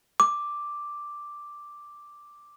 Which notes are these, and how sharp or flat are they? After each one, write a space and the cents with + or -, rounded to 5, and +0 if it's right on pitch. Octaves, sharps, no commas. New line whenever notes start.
D6 +0